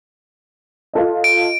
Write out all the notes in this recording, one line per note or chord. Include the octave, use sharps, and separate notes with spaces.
F4 A4 D#5
D7